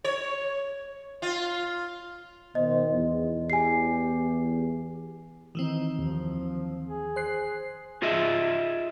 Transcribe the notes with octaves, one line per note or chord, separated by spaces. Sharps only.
C#5
F4
B2 D#3 C5 D#5
E2
G4 G#5 C7
D#3 E3 C4 D#4
D#2 F3
G#4
C5 F#6 C7
F4 G#4 D#5 E5